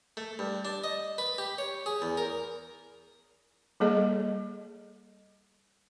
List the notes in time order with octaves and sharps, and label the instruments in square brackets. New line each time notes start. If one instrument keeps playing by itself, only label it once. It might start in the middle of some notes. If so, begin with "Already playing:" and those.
[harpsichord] A3
G2
D4
D#5
B4
G4
C#5
G#4
E2
A#4
[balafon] G3 A#3 G#4 A4 D#5